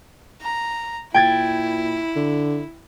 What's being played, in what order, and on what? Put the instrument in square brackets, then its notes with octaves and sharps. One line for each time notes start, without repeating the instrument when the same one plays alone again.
[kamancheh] A#5
[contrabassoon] A#2 [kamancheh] E4 [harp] G5 G#6 A6
[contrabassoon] D3